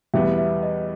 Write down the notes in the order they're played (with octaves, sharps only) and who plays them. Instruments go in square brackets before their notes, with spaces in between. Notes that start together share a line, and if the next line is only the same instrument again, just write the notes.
[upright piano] E2 B2 G3 B3 [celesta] E5
[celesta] E5
D#5